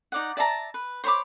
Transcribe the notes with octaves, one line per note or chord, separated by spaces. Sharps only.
D#4 D5 F#5
D5 E5 A5 A#5
B4
C5 C#5 B5 D6